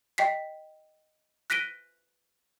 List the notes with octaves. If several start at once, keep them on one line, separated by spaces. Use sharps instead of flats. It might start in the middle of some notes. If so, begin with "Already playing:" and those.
D#5 G5 B6 C7
F#6 A#6 B6 D7 D#7 G7